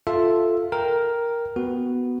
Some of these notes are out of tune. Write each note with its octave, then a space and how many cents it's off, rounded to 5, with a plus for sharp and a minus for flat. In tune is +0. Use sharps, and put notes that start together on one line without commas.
F4 +0 A4 +0 E5 +0
A#4 +5 G5 +0
B3 +0 F#4 +0